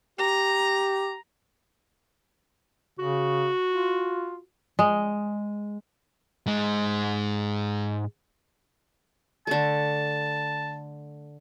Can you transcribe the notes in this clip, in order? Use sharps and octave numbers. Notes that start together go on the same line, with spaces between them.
G4 A#5
C#3 F#4
F4
G#3
G#2 G#3
D3 A3 A5